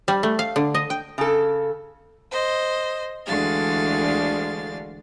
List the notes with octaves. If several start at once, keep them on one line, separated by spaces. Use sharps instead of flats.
G3
A3
F5
D3
D#5
G5
C#3 A4
C5 D#5
D2 D3 E3 G#3 F5 A6